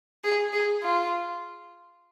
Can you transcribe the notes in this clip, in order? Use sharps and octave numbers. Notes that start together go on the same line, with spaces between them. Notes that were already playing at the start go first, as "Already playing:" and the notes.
G#4
G#4
F4